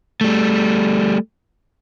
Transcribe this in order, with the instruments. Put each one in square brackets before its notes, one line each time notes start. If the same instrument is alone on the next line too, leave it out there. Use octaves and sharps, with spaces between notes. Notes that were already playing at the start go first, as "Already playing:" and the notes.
[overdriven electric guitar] G3 A3